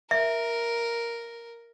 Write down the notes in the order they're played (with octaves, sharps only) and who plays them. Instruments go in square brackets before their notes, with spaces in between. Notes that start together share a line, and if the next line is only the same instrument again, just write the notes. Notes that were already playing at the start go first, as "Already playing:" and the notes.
[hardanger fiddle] A#4 [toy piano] E5